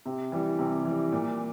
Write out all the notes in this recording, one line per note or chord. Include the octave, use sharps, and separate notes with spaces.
C3
E3 G3
C3
E3 G3
A#2